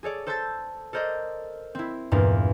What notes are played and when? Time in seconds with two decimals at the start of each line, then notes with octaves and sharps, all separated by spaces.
0.03 G#4 A4 C#5 D5
0.26 A4 C5 A5 E6 G6 A6
0.93 A4 A#4 C5 D5 D#5
1.75 C4 E4
2.11 E2 G2 A#2 A#3 F4